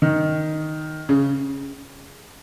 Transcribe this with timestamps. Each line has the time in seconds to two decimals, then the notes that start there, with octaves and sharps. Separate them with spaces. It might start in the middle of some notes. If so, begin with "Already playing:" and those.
0.02 D#3
1.09 C#3